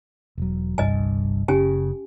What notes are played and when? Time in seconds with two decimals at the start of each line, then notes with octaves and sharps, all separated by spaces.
0.38 E1 F#3
0.78 G1 C2 G2 D#5 G#5
1.48 F#1 C#3 C#4 G4 G#5